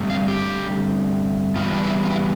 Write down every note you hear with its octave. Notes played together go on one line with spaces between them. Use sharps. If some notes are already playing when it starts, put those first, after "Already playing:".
Already playing: G2 D3 A3 C4
F5
G4
E2 C3 G3 B3 F4
D4
E4
F4
E4